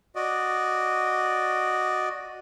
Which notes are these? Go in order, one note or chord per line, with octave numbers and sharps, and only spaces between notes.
F#4 D5 D#5